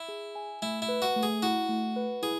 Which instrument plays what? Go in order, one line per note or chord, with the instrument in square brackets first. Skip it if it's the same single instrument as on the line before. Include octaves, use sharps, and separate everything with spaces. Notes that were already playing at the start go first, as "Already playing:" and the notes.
Already playing: [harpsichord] E4
[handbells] G#4
G#5
[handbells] A3 [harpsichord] E4
[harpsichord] E4
[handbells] B4
[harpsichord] F#4
[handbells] A3
[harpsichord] G#4
[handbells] E4 [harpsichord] F#4
[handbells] A3
B4
[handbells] E4 [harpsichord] G#4